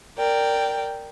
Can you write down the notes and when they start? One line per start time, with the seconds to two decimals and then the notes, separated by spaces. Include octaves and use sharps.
0.17 A#4 D5 G5